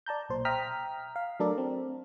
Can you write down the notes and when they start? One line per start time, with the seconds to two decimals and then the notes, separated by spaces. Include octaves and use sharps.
0.06 D5 A5 A#5 G6
0.29 B1 A#2 C5
0.45 E5 G5 A#5 D#6 F6 B6
1.16 F5
1.40 F#3 A3 D4 A4 A#4 D5
1.58 C4